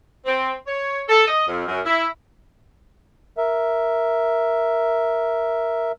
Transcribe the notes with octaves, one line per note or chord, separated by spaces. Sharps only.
C4
C#5
A4
D#5
F2
F#2
E4
A#4 E5